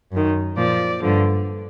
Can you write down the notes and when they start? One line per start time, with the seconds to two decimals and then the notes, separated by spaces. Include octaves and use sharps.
0.12 F#2 D#3
0.57 A#2 F3 D5
1.02 G2 D3 F3